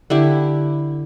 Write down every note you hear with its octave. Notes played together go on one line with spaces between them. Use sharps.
D3 E4 G4